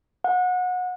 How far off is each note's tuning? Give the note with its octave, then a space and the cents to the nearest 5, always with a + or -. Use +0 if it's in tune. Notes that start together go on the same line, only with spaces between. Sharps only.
F#5 -25